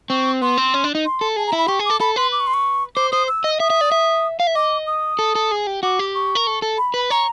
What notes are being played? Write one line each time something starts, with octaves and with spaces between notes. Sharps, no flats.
C4 C#6
B3 C6
C4
C#4
D4
D#4
C6
A4
G#4 A5
A#5
E4
B5
G4 C#6
G#4
A4 D6
A4 B5
B4 C6
D6
C#6
C6
C#6
C5 D6
C5 D#6
E6
D#5
E5 D#6
E5
D5
E5
F5
E5
D#5 D6
D#6
A4
A4
G#4
G4
F#4 D6
G4
C#6
A#4
A4
A4
B5
B4
C#5 A#5